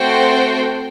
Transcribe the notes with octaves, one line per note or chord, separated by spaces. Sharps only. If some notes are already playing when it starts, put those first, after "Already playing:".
Already playing: A3 C4 F#4 C5 G5